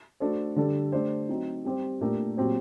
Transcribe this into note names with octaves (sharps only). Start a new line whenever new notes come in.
A3 D4 F#4 A4 C5
D3 G3 D4 A4
A3 D4 G4 C5
F#3 C4 D#4
G3 C4 G4 C5
A#2 A3 D4 G4 A#4
A#2 F#3 C4 G4 C5